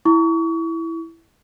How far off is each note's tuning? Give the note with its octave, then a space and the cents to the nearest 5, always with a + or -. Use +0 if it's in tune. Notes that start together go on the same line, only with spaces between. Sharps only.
E4 +0 C#6 +35